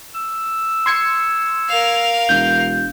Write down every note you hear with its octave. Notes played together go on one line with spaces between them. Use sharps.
E6
C6 G#6 C#7
A#4 F5
E1 G6